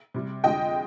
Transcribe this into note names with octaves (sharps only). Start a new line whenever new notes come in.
C3 G3
F2 D3 G#3 D#5 G5